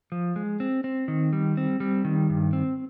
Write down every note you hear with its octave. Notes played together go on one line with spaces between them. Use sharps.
F3
G#3
C4
C4
D#3
G3
C4
G3
D#3
G2
C4